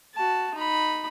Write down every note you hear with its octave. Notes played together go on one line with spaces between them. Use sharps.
F#4 A5
D#4 B5